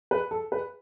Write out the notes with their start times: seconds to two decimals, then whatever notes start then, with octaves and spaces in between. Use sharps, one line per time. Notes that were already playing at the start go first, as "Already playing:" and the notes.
0.11 B4
0.31 A4
0.52 B4